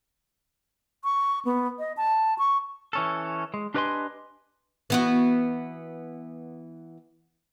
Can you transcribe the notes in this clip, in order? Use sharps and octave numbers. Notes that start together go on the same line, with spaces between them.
C#6
B3
D#5
A5
C#6
E3 C#4 A4
G#3
D4 G4 B4 D#5 G#5 C6
E3 B3 F#4